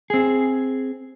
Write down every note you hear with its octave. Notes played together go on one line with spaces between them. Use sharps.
C4 G#4